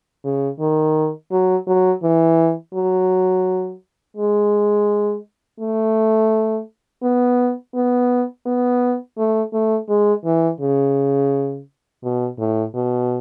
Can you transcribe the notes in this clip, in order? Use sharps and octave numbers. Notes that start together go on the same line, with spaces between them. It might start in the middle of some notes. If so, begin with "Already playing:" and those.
C#3
D#3
F#3
F#3
E3
F#3
G#3
A3
B3
B3
B3
A3
A3
G#3
E3
C#3
B2
A2
B2